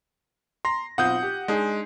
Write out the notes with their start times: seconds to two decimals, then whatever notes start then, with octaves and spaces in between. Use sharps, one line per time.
0.65 A#5 C6 A#6
0.98 B1 C4 F4 F#5 D#6 G6
1.23 G4
1.48 G#3 D4 D#4 G#4